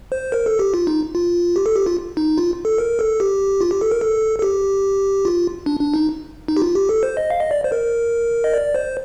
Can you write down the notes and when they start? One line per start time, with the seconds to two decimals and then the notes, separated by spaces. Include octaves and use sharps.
0.12 C5
0.32 A#4
0.46 A4
0.59 G4
0.74 F4
0.87 D#4
1.15 F4
1.56 G4
1.66 A4
1.76 G4
1.86 F4
2.17 D#4
2.38 F4
2.65 A4
2.78 A#4
2.99 A4
3.20 G4
3.61 F4
3.71 G4
3.81 A4
3.91 A#4
4.01 A4
4.39 A4
4.42 G4
5.25 F4
5.66 D4
5.80 D4
5.94 D#4
6.48 D#4
6.57 G4
6.62 F4
6.75 G4
6.89 A4
7.03 C5
7.17 D#5
7.30 F5
7.40 D#5
7.51 D5
7.64 C5
7.72 A#4
8.44 D#5
8.53 D5
8.75 C5